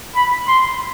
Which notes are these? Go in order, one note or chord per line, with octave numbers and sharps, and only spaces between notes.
B5
C6